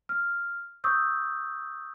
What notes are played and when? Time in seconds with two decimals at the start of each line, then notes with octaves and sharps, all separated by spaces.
0.09 F6
0.84 C#6 D#6 E6 G6